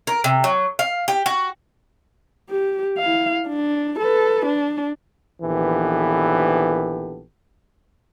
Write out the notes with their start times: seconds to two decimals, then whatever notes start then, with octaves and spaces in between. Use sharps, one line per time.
0.07 A#4
0.24 C3
0.44 F#3
0.79 F5
1.08 G4
1.26 F#4
2.50 G4
2.99 E4 F5
3.48 D4
3.99 A4 B4
4.46 D4
5.42 A#1 D#3 E3 B3 G4 A4